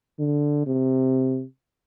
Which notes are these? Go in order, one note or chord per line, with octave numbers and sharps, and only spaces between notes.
D3
C3